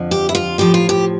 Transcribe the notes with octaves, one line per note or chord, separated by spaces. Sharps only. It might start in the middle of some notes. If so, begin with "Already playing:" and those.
Already playing: F2 D3 F3
G4
E4
F4
A2 F3 G4
F4
G4